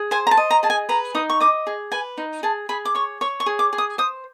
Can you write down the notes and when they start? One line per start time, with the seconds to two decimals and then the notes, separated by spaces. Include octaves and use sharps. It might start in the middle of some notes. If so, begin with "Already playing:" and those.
Already playing: G#4
0.11 C5 G#5
0.27 A#5
0.31 A5
0.37 D#5
0.51 A#5
0.63 G#4 A5
0.70 G#5
0.89 B4 A#5
1.15 D#4 D#6
1.30 C#6
1.40 D#5 D6
1.67 G#4
1.92 B4 G#5
2.18 D#4
2.43 G#4 A5
2.69 G#4 B5
2.85 D6
2.95 C#5 C#6
3.21 C#5 C#6
3.40 C#6
3.46 G#4
3.59 D6
3.73 G#4
3.78 D#6
3.98 C5 D#6